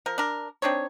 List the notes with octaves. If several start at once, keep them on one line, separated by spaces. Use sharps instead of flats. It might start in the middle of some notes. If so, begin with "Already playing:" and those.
F3 A#4
D4 A#4
C4 D4 D#4 C#5